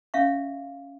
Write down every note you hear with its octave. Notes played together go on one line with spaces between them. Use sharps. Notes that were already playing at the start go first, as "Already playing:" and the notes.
C#4 E5 F5 C#6